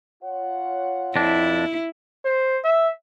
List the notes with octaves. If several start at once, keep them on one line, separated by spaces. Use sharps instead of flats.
F4 C#5 F#5
F2 D4 E4
C5
E5